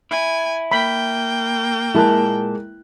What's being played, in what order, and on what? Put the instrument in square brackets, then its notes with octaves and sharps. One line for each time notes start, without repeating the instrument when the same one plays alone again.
[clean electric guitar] E4 [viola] G#5
[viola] A#3 G5 [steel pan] B5
[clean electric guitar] A#2 A5 [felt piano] G#3 A#4 F#6 [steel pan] E4